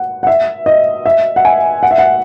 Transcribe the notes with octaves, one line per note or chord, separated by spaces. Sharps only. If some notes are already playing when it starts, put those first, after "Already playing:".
Already playing: F#5
F#5
E5
D#5
E5
F#5
G#5
F#5
E5
F#5